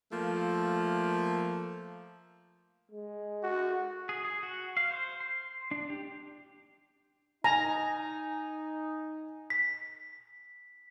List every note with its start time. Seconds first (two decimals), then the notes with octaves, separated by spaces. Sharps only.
0.12 F3 A3 A#3
2.91 G#3
3.43 F#4
4.09 G#4
4.25 G#4
4.43 F#4
4.77 F5
4.91 C5
5.20 C6
5.71 D4
5.90 G4
7.44 D#4 G#5 A#5
9.50 B6